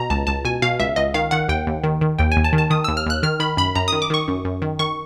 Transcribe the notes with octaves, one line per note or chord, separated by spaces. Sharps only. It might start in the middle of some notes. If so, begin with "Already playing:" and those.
Already playing: B2 A#5
C#2 A5
C#2 A5
B2 G#5
B2 F5
C#2 E5
C#2 D#5
D#3 F5
D#3 F#5
D#2 G5
D#2
D#3
D#3
D#2 G5
G#5
D#2
A5
D#3
A5
D#3 D#6
D#2 E6
F6
D#2 F#6
D#3 F6
D#3 B5
F#2 B5
F#2 A#5
D#3 D#6
D6
D#3 C#6
F#2
F#2
D#3
D#3 C#6